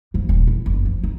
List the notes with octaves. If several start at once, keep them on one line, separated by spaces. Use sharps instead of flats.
F3 A#3
D#1
E2
F#1
F3
D#4